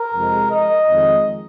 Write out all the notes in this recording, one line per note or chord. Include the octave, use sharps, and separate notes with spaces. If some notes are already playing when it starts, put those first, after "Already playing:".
Already playing: A#4
F2 C3 G#3
D#5
F2 D#3 G#3